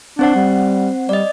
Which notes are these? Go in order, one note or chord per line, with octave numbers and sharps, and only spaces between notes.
C4 D4 C5 F#5
G3
G3 D5 D#5